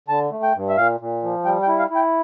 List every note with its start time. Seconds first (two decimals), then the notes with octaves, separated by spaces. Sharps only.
0.08 D3 A5
0.31 A3
0.43 G5
0.55 G2
0.69 E5
0.76 A#2 F5
1.00 A#2
1.23 F3
1.45 G3 G5
1.63 G5
1.67 E4
1.79 F5
1.90 E4
1.95 G5